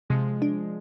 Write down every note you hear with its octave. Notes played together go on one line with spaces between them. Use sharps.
C3 F3 G#3
D4